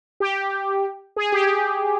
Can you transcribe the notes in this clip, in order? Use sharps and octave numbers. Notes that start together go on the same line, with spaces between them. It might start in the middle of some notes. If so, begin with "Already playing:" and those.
G4
G#4
G4